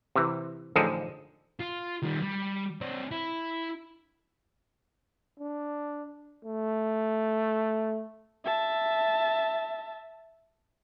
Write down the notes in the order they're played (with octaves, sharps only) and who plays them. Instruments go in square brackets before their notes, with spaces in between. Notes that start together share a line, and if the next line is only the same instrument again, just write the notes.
[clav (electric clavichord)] C3 E3
A1 D3 F3 D#4 G#4 A4
[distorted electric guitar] F4
D#3 G3
G3
C4 D4
E4
[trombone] D4
A3
[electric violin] E5 A5